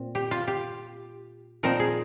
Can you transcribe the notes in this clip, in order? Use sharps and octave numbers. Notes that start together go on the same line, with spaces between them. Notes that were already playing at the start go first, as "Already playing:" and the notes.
Already playing: A#2 C4
G4
F4
G4
A#2 F3 C4 D#4 A#4
G#4